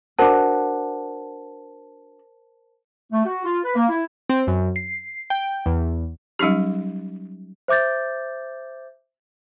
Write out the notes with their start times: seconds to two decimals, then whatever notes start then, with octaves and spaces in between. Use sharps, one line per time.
0.19 D4 F#4 A#4 C5 A5
3.12 A3
3.25 F#4
3.45 F4
3.64 B4
3.76 A#3
3.89 E4
4.29 C4
4.47 F#2
4.76 C7
5.30 G5
5.66 E2
6.39 F#3 G3 C#4 D#4 G4
7.68 C5 E5 D6 G6 A6